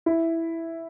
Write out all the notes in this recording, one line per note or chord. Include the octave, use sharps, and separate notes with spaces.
E4